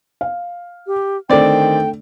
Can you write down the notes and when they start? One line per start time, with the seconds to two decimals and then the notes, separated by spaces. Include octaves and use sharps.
0.21 F5
0.87 G4
1.30 D3 D#3 A3 C4 D5 G5